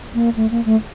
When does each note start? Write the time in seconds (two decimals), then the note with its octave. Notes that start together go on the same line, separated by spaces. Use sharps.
0.14 A#3
0.36 A3
0.51 A#3
0.65 A3